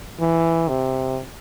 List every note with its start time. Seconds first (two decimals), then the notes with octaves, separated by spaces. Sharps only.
0.21 E3
0.68 C3